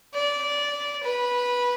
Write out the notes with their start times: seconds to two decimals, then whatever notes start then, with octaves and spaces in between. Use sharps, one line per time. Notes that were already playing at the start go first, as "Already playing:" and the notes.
0.15 D5
1.04 B4